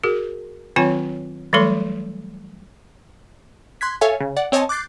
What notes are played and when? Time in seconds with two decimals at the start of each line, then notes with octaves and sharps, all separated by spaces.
0.03 F#4 G#4 A#4
0.76 D#3 F#3 C4 F4 C#5 G#5
1.53 E3 F#3 G3 A3 A4 C6
3.81 C6 F#6 G#6 B6
4.01 A4 C#5 E5 F5 G#5
4.20 C#3
4.36 D5 F#5
4.52 C4 C#5 D#5 G#5 A5
4.69 D6 F#6 G6 A6 C7